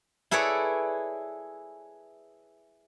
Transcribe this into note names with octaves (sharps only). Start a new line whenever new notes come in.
E4 G#4 A4 B4 C#5 D5